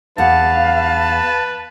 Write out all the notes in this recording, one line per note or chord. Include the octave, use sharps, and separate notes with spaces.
E2 B4 F5 F#5 A5